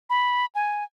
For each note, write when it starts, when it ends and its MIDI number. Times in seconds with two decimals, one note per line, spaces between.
0.10 0.45 83
0.55 0.84 80